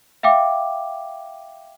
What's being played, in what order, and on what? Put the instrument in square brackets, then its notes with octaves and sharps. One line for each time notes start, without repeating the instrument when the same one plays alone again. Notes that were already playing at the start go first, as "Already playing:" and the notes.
[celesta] E5 F5 G5 D6